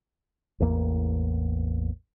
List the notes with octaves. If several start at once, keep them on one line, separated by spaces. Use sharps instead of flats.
A1 E2 A#3